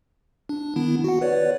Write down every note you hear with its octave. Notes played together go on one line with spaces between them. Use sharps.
D4
D#3 B3 E4
F#4 F#5
B4 C#5 D5